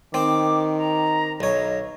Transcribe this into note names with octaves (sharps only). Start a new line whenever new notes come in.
D#3 C4 G5 D6
A#5
B1 C#5 D#5